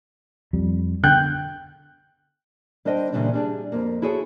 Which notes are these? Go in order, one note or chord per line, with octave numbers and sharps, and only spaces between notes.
F2 G3
D3 G5 F#6 G6
G3 D4 C5 D#5 F5 G5
A#2 C#3 E3 G3 D4
G3 D4 G#4
F2 A#3
E4 F#4 G#4 A4 C#5